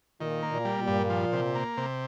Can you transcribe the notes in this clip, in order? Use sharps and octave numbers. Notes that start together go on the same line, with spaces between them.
A#2 D#3
A#3
A#2
G3
A#2
G2
F3
C3
A#3
C3